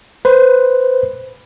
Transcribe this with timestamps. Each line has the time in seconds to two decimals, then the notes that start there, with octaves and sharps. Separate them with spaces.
0.25 B4 C5